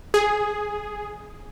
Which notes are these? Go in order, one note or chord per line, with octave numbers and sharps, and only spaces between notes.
G#4